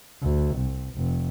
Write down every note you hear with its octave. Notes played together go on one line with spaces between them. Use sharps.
D2
C2
F1